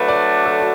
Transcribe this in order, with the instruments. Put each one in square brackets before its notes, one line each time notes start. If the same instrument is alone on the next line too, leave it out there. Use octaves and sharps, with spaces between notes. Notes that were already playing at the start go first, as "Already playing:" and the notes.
Already playing: [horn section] F#3 A3 D4 [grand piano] B4
[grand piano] D5
A4
F#4